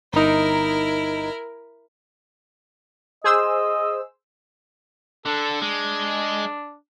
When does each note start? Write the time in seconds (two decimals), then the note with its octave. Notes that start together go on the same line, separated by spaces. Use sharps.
0.13 G1 D#4 E4 A#4
3.24 G#4 C5 D#5 E6
5.26 D3 A4
5.62 G#3 D4